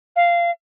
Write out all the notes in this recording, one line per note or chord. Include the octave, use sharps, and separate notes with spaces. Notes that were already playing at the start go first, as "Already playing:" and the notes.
F5